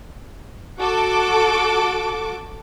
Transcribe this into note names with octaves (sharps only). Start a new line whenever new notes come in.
F#4 A4 D6